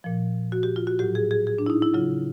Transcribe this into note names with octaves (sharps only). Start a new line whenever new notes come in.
A#2 F3
F#4
G4
F4
F#4
A2 F#3 G4
G#4
G#4
G#4
D4
E4
D#4
E4
C#3 F#3 F4